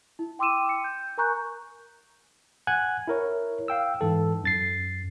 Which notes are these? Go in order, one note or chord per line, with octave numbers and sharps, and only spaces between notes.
E4
G5 C6 D6 E6 D#7 E7
C#7
G6
A#4 G#5 A#5 C#6 F#6 G6
F#5 G#5 F#6 G#6
E4 A#4 C#5
F5 G5 E6
G#2 E3 A4
F#2 A6 C7